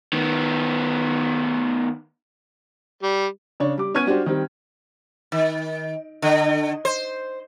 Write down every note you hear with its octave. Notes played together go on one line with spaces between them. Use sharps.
D#3 B3
G3
C#3 D4 C#5
G3 D6
B3 C#4 C#6 F6 G#6 D#7
G3 D4 F#4 G4 C5
D#3 G3 C4
D#3
D3
C5